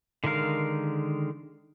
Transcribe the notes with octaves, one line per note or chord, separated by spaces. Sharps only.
D3 D#3 G#3 A#4 F5